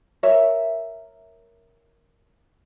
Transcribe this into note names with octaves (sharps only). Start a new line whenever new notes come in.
A#4 C#5 E5